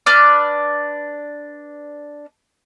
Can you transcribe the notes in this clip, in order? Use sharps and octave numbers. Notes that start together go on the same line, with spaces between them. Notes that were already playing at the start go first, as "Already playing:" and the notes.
D4 B4 D5 F6